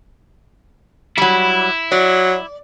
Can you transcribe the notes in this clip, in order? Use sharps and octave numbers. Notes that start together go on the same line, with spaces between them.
F#3 G3 E4
F#3 D5